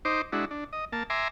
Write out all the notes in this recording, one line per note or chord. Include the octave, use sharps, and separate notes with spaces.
D#4 C5 D6
G#3 D4 E4 F#4
D4
D#5
A#3 A5
E5 G#5 A#5 C6 D6